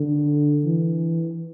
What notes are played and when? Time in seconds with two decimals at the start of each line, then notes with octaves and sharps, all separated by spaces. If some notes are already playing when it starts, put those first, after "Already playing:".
Already playing: D3
0.65 E3